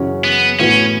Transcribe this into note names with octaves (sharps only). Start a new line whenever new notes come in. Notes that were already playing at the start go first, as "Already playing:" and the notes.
Already playing: F#2 C#3 E3 C#4 F#4
B3
A2 E3 B3 C#4 F#4